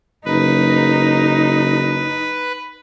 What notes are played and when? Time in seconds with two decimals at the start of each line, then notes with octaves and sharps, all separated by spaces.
0.26 F#1 D#4 B4